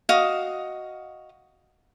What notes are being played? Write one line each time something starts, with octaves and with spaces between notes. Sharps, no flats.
F#4 D#5 F5 D#6